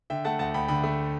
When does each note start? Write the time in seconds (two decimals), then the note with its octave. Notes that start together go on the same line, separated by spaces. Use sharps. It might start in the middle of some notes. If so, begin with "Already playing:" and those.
0.10 D3 E5 G5
0.24 A3 F#5 A5
0.39 D2 F#5 A5
0.54 D2 G5 B5
0.68 D3 G5 B5
0.84 A3